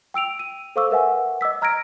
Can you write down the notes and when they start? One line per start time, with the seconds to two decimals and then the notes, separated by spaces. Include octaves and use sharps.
0.14 G5 E6 D7 F7
0.39 D#7
0.76 A4 C5 F5 C#6 D6 E6
0.90 A#4 B4 E5 F#5 G#5
1.41 D#5 D6 E6 B6
1.62 D#5 A#5 F6 G#6 A#6 D7